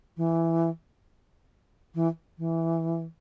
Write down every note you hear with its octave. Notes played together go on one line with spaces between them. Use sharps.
E3
E3
E3